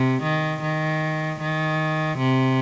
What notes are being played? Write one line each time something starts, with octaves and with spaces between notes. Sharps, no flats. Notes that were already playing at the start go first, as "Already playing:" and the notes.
Already playing: C3
D#3
D#3
D#3
C3